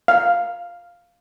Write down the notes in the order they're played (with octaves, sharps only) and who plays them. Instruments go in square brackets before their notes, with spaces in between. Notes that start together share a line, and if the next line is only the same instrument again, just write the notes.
[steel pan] F5